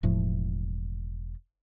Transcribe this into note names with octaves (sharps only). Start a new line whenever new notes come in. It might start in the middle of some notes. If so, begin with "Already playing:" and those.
E1 A2 F3